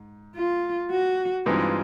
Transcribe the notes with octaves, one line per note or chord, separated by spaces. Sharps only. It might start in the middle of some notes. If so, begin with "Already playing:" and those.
Already playing: G#2
F4
F#4
G2 E3 G#3 C4 D#4 F4